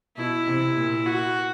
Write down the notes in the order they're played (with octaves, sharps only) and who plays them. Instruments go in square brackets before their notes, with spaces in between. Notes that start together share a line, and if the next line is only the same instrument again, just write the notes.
[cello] B2 [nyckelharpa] E4
[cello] C3
A#2
[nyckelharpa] F#4